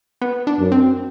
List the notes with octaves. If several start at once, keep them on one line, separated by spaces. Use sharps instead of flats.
B3
D4
F#2
C4